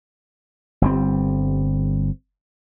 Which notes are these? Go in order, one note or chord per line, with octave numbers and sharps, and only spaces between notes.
G1 G3 C4